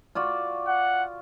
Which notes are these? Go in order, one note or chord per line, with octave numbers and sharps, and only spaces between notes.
F4 F#4 D5
F#5